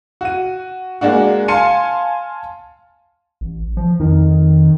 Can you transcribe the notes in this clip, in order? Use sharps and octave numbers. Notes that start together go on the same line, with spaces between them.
F#4 D#7
G#3 A#3 D4 F#4
F5 G#5 A5 C6 C#7 D#7
A1
F3
F2 D#3